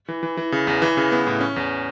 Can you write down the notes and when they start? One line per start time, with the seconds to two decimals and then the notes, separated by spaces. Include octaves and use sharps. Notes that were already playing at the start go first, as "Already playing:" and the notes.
0.08 E3
0.23 E3
0.37 E3
0.52 C#3
0.67 E2
0.82 E3
0.97 C#3
1.12 B3
1.27 A2
1.41 C#4
1.56 E2